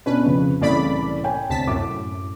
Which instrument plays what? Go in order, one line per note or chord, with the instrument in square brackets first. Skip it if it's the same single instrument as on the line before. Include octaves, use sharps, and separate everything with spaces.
[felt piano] B2 C#4 D4 [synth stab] B4
[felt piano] F2 C#3
[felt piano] C2 A2 E3 [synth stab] C#3 D5 B5
[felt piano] C#5 G5 G#5
[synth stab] D2 A5 B6 [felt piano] C3
[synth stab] F#2 A2 [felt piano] D6